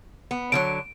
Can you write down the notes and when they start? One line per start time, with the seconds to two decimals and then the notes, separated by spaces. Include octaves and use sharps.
0.31 B3
0.52 D3 F3 F#3 D7